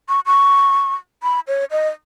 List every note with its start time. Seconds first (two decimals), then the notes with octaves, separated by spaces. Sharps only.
0.09 C#6
0.26 C#6
1.23 B5
1.48 C#5
1.71 D#5